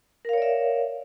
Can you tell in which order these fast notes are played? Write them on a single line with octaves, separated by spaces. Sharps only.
A#4 F5 C#5 D5 E5